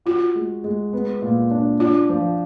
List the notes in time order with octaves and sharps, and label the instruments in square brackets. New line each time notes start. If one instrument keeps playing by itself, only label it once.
[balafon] F4 [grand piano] F#4
[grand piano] G#3
G#3
B3
A#2
D4
[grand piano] D4 [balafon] F4
[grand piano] F3